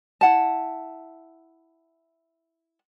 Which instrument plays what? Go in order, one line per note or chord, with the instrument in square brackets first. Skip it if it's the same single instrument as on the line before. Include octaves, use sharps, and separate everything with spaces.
[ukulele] E4 F#5 A5